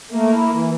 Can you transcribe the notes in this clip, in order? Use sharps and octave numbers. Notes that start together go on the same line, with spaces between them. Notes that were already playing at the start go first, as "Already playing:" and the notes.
A3 A#3
E4
E3